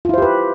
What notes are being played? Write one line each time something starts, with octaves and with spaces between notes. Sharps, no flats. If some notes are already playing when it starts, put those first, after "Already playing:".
E4 F4 G4 B4 C5